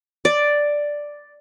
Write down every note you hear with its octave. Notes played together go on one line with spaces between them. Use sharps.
D5